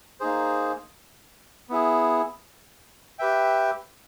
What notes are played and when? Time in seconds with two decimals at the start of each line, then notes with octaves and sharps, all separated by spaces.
0.20 A#3 D#4 G#4 C5
1.69 B3 E4 G#4
3.19 G4 B4 E5 G5